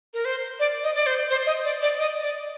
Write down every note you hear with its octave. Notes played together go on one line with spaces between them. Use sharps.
A#4
C5
D5
D#5
D5
C5
C5
D#5
D5
D5
D#5
D5